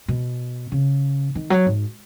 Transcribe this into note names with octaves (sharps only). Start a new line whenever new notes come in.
B2
C#3
D#3
F#3
G#2